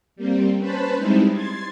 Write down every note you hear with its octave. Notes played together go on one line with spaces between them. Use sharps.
G3 A#3 C4
C#4 B4 C5 A5 B5
G3 G#3 C4 D#4 E4
C6 G#6 A6